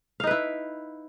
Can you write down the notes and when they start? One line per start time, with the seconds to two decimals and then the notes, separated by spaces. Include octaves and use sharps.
0.20 F5
0.24 D#4
0.27 B4
0.31 E4